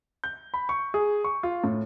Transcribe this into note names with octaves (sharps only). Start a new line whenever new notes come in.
G6
B5
C#6
G#4
C#6
F4
A2